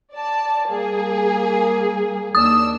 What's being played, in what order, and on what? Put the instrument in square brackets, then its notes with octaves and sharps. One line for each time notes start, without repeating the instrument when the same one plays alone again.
[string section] D5 A5
G3 A#3 G#4
[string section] D#2 D4 E6 [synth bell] D#6